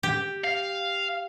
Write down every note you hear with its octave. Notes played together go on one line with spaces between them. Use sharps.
G4
F5